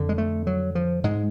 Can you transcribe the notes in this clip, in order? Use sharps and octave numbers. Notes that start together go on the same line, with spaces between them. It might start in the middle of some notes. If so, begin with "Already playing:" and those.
Already playing: F2 D3
G#3
A3
F#3
F3
G#2 G#3